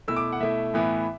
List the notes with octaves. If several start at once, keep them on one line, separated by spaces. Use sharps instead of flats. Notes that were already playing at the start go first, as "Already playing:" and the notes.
B2 A3 E4 E6
D6
F#5
B2 A3 E4 E5
A2 E3 B3 E4